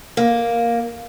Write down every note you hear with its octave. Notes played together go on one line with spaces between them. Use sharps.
A#3